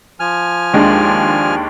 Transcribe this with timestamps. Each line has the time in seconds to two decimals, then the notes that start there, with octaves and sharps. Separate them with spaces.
0.20 F3 G#5 F6
0.74 D#2 G#3 D4